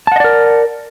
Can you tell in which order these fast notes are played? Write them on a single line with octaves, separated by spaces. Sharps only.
A5 F#5 D#5 D5 A#4